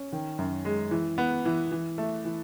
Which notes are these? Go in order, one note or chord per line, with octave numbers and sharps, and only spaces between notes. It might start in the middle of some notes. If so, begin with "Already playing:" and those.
Already playing: C#4
D#3
F#2
G#3
E3
B3
E3
E3
A3
E3